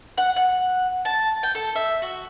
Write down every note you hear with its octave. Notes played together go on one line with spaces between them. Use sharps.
F#5
F#5
A5
G5
A4
E5
F#4